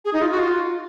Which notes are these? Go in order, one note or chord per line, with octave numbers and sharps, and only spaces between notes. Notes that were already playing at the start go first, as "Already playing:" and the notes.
G#4
D#4
F4
F#4
F4